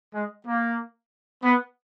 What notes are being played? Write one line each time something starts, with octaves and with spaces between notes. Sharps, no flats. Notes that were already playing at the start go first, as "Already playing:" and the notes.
G#3
A#3
B3